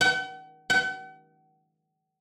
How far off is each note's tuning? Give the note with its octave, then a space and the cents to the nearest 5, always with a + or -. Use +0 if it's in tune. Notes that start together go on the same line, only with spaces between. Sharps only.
F#5 +45
F#5 +45